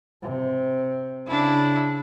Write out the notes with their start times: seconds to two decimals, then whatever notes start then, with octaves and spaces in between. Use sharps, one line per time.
0.22 C3
1.27 C#3 D4 E4